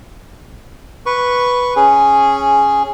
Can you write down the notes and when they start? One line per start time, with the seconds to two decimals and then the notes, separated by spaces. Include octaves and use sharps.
1.06 B4 C#6
1.76 C#4 G#4